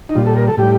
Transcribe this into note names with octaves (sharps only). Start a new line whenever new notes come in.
D#4
A#2 G3 F4
A4
A#4
A4
A2 G3 G4